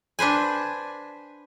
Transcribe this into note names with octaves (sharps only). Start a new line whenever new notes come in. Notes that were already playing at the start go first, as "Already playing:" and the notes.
D4 B4 C5 G#5